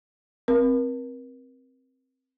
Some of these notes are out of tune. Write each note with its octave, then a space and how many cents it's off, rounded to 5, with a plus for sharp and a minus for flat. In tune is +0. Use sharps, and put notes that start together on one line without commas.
C4 +0 A#4 +35